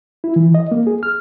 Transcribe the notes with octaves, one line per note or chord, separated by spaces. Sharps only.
E4
E3
D#5
A#3
G#4
F6